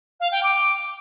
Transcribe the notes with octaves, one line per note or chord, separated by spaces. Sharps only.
F5
G5
D6